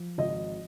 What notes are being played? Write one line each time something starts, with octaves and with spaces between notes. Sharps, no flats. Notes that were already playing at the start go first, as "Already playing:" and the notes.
Already playing: F3
G#1 D#5